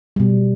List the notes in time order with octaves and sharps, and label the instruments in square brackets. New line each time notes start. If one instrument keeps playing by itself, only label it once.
[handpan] B2 G3